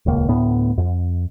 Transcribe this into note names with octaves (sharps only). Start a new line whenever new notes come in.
D#1 C#2 A#3
D2 A2 B3
F2